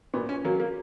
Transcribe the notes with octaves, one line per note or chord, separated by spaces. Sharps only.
A#2 B3
C#4
F#3 A#3
A#3